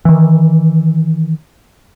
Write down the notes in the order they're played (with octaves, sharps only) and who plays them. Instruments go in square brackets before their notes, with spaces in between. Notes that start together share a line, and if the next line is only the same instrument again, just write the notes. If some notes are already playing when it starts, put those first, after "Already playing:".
[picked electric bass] D#3 E3